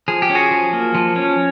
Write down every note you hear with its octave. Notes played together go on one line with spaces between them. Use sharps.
F3 G#4
G4
C#4
F#4 G#4
F3
A#3
F3
C#4